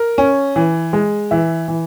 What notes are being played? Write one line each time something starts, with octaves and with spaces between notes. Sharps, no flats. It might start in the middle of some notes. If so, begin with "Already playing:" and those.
Already playing: A#4
C#4
E3
G#3
E3 E5
E3